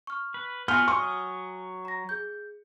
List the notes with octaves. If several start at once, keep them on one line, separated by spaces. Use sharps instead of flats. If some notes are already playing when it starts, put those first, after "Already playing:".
C#6 F6
B4
B3 F4 F#4 G#5 F6 G7
F#3 C#6 D#6 F6
A#5 A#6
G#4 G6